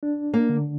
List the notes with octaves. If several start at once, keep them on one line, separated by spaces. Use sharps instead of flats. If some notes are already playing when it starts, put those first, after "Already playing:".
D4
A#3
D3